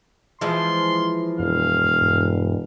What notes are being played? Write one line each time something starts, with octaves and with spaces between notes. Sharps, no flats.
E3 F3 G#3 C6
E1 F#2 F5
G2